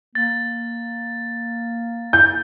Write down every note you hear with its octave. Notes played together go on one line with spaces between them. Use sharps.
A#3 A6
G6